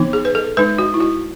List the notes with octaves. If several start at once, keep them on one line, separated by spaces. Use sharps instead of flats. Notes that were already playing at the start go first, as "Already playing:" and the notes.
Already playing: E3 B3 D#4
G#4
B4
A4
G#3 D#4 B4
F#4
E4
F#4